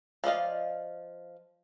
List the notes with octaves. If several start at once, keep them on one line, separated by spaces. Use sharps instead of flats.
F3 D5 D#5 F5